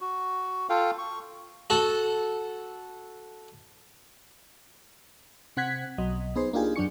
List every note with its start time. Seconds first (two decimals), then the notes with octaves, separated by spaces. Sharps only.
0.01 F#4
0.69 F4 A4 F5 G5
0.98 C#6
1.70 F#4 A4
5.57 C3 C4 F#5 F#6 G#6 B6
5.98 B1 F#3 D#5
6.36 B3 D#4 G#4 C5
6.53 A#3 D4 D#4 F4 G4 G#4
6.76 F#2 F#3 D4 C#6 C#7